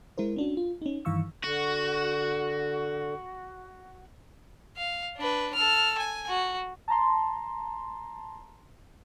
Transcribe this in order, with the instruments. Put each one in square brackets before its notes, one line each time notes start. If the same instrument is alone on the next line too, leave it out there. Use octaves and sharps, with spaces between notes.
[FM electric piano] G#3 E4 A#4 C5
C#4 D4 F#4
F4
C#4 D#4
G2 D#3 E3 F5 C#6 E6
[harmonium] D3 [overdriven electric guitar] F#4
[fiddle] F5
D4 B4
A4 F6
G#5
F#4
[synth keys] A5 A#5 C6